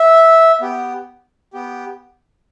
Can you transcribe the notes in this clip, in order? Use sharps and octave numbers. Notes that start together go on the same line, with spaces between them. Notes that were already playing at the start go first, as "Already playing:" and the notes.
Already playing: E5
B3 G4
B3 G4